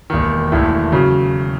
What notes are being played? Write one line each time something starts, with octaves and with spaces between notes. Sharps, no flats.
E1 D#2 D#3
E1 D#2 D#3 A3 E4
C#3 F#3